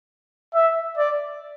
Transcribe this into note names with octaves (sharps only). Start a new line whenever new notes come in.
E5
D5